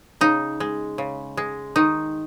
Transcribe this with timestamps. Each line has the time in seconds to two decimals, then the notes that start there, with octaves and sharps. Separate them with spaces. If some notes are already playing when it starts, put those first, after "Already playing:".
0.21 C#3 D#4
0.60 G#3
0.98 C#3
1.37 G#3
1.76 D#3 D#4